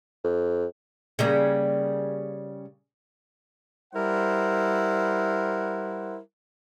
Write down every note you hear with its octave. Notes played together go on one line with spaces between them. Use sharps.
F2
C#3 G3 A#3
G3 E4 A#4 C5 F#5